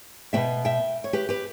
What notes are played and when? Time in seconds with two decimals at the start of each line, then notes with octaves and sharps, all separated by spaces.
0.33 B2 F#3 B3 E5 G5
0.65 E5 G5
1.04 C#5
1.13 G4 B4
1.29 G4 B4